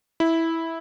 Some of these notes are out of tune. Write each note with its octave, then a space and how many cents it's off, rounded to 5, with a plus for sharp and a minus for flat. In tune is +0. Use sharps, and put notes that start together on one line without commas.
E4 -10